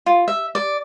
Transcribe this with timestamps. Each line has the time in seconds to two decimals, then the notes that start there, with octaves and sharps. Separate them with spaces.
0.06 F4
0.28 E5
0.55 D5